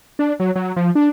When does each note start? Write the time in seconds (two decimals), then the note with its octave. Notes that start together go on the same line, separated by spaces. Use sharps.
0.19 D4
0.40 F#3
0.56 F#3
0.76 F3
0.95 D4